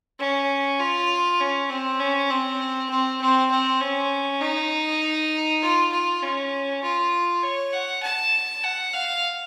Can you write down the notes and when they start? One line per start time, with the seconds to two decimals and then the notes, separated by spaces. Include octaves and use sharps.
0.19 C#4
0.79 F4
1.40 C#4
1.70 C4
2.00 C#4
2.31 C4
2.90 C4
3.21 C4
3.51 C4
3.81 C#4
4.41 D#4
5.62 F4
5.92 F4
6.22 C#4
6.83 F4
7.43 C#5
7.73 F#5
8.03 A5
8.64 F#5
8.93 F5